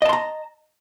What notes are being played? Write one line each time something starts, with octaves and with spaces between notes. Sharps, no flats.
D#5 A5 A#5 C6